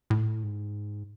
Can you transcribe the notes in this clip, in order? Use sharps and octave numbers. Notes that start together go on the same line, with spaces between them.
A2
G#2